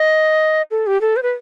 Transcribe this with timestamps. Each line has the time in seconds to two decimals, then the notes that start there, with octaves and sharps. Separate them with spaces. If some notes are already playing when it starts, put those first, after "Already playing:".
Already playing: D#5
0.71 A4
0.87 G4
1.01 A4
1.16 C5
1.23 B4